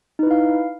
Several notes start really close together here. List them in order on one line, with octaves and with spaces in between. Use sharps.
D#4 B4 E4 F5